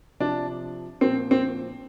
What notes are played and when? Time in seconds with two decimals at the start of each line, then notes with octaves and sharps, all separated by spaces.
0.20 C3 F3 D4
1.01 A#2 F3 C4
1.31 C4